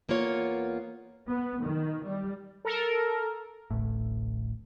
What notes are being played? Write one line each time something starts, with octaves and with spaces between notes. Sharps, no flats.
E2 A#3 B3 F4 C#5
B3
D#3
G3
A4 A#4
D1 A1 A2